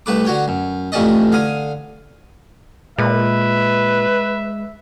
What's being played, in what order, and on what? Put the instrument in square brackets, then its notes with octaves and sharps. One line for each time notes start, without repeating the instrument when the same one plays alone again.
[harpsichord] C2 A3 B4 D6
D3 F#4 C#5 G5
F#2
A1 F2 C3 C#4 D5 D#5
D3 F5 G#5 D#6
[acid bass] A#2 [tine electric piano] G#3 [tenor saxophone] B4 [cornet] E5